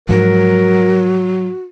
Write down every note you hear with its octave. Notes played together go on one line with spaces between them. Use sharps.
G#2 F3 F#3 F#4 A#4